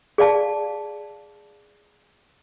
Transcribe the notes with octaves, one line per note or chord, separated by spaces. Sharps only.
G#4 D5 F5 A5